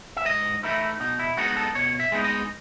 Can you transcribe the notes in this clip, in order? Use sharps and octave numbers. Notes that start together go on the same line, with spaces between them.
E5
G#2 D#5
E3 A3 D#4 E4
B2 D#4
E4
G#3 B3 D#4 F#4
A4
B2 C#5
E5
G#3 B3 D#4
D#5